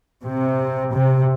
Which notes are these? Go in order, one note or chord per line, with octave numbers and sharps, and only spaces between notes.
C3
C3